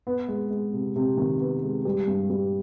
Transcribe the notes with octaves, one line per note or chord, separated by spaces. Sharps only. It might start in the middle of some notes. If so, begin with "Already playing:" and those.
B3
G#3
G#3
C3
C3
D#3
B3
G#3
G3
G2
G3